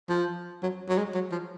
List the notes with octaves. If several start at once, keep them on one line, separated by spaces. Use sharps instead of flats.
F3
F#3
F#3
G#3
F#3
F3